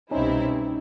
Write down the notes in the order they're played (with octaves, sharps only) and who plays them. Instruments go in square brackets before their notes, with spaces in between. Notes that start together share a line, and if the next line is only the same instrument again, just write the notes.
[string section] C2 B2 G3 C4 E4 [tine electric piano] C#4 D#4